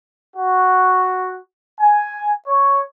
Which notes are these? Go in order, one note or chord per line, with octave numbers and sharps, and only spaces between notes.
F#4
G#5
C#5